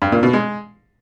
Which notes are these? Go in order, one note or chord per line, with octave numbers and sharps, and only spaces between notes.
G2
A#2
B2
G#3